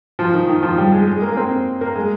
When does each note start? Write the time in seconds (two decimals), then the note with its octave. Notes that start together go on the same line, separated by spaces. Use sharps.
0.19 F3
0.33 D#3
0.48 D#3
0.63 F3
0.78 G3
0.92 G#3
1.07 G#3
1.22 A#3
1.32 A#3
1.37 C4
1.81 A#3
1.95 G#3